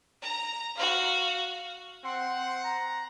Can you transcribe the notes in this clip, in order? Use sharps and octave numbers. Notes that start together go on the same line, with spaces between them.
A#5
F#4 F5
C4 F#5 C6
A#5